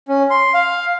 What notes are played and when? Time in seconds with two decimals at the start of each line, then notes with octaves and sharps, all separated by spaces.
0.08 C#4
0.30 C6
0.54 F5